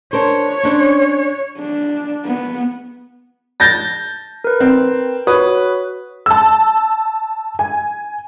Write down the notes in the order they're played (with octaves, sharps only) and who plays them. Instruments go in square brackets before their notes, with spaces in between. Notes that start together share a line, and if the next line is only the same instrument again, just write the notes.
[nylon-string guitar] D4 A#4 C5 [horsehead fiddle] C#5
[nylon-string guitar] C#4 D4 C5
[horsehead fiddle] D4
B3
[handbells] A5 [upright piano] G6 A6 A#6
[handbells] A#4 B4
[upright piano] C4
[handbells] F#4 C#5 D#6 [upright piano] B4
[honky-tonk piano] A5 E6
G#5